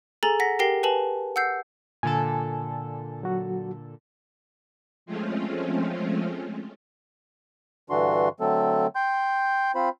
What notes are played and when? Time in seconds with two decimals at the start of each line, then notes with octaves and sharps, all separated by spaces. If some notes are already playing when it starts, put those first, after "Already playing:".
0.23 G#4 A4 G#5 A#5 A6 F#7
0.40 F#5 A#6 B6
0.59 G4 A#4 G5 A#6 C7 G7
0.83 B4 G#5 A5 F#7
1.36 F#5 E6 G6 C7
2.03 A#2 D3 A4 G#5 A5
3.23 F#3 F#4
5.06 F3 G#3 A3 C4 C#4 F4
7.90 G2 D3 E3 D4 F#4 C6
8.40 D3 F#3 A3 C4 A4
8.95 G5 C6 G6
9.75 C4 F4 C5 B5